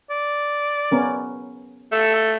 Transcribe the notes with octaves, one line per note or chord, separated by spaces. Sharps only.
D5
B3 C#4 A#4
A3 A4
A4